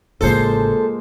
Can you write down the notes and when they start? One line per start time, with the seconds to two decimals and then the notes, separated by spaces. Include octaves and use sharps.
0.21 A1 C#3 F3 G#3 A#3 A4 C5